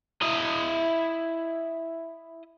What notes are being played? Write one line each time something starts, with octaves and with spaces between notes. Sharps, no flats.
E4 D#5